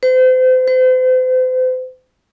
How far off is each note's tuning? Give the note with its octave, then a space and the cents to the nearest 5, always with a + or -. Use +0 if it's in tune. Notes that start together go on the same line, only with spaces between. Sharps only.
C5 -35
C5 -40